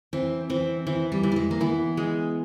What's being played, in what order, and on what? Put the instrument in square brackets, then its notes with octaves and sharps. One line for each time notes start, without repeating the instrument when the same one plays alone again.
[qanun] E3 [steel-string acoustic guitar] C4
[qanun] E3 [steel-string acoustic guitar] C4
[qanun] E3 [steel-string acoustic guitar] C4
[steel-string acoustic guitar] G3
[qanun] E3
[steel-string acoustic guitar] G3
G#3
A#3
[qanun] E3 [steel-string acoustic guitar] B3
[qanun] G#3